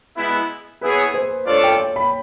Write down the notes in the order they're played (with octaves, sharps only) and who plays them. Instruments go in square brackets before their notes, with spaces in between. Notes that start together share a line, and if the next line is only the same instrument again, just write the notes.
[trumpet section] G#3 B3 E4
[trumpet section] B3 E4 G#4 C#5 [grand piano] B4
[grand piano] C5
[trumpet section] A3 D4 F4 A4 D5 [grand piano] C#5
[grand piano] G5
B5